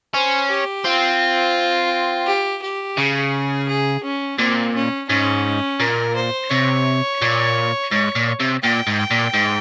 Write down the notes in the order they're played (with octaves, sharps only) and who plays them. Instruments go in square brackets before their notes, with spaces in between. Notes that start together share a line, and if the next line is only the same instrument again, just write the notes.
[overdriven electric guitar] C#4 [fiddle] C5
[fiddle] G4
[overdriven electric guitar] C4 [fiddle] F4
[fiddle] G4
G4
[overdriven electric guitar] C#3 [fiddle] G#4
[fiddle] G#4
C#4
[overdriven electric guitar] A#2 [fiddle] C4
[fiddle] C#4
[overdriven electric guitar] G#2 [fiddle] C#4
[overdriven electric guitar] A#2 [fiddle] A#4
[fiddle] C5
[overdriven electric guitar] C3 [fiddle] C#5
[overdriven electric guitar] A#2
[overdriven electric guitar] G#2 [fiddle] C#5
[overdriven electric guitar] A#2
C3
[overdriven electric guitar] A#2 [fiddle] G5
[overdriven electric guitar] G#2
[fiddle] G5
[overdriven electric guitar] A#2
G#2